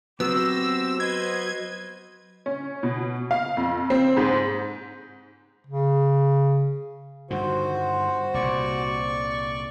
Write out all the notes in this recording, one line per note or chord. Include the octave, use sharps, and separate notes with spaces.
F#3 B3 C4 F#4 G4 E6 A#6
B4 C5 D#5 G#6
C#4
B2
F5
F2
C4
G#2
C#3
G2 D3 D#3 F#4 C5
C2 A#2 D5 C#6